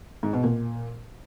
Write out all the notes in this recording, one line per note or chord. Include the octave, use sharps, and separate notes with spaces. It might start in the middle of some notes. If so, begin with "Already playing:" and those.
G#2
B2
A#2